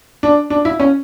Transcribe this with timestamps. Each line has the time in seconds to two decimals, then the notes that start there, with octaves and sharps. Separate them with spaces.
0.23 D4
0.50 D4
0.65 E4
0.80 C#4